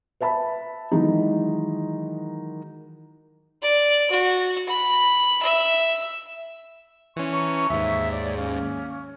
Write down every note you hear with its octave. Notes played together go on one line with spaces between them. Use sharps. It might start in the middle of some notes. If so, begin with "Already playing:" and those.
B4 E5 A5 B5
D#3 E3 F#3 G#3 D#4
D5
F#4
B5
E5
E3 C#4 G#5 C6 C#6
A5 A#5 C#6
D#2 G#2 E5
G#4 C#5 D5
A#3 C#4